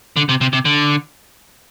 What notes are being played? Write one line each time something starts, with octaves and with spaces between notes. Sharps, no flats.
D3
C3
C3
C3
D3